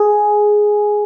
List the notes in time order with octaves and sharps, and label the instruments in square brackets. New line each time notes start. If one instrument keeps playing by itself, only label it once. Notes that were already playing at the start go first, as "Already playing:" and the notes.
Already playing: [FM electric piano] G#4